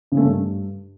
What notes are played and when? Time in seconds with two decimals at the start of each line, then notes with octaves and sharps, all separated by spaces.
0.12 C#3
0.17 A3
0.22 G2